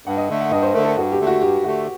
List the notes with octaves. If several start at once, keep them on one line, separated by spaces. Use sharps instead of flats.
G2 F#5
D#5
D3 A3
F#5
G2 D#5
C5
D3 A3 A#4
A4
G2 F#4
G4
D3 A3
F#4
G2 G4
D3 A3 F#4